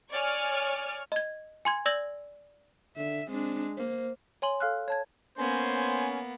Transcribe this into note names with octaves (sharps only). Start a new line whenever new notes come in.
C#5 D5 G#5 C#6 F6
D#5 G#6
G#5 C6 G#6
D5 E6 G#6 A#6 F#7
D3 E5
G#3 C4 D4
A#3 C5
C#5 G#5 C6 F#7
A4 F5 F6 F#6
C#5 A5 G#6
A#3 B3 C#4 C5 G#5